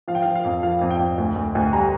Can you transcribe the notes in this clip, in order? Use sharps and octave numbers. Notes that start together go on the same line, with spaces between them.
F3 F5
G5
F3 F5
F5
F2
F3 F5
F2
G5
F2
D2
D2
D2
G3 A#5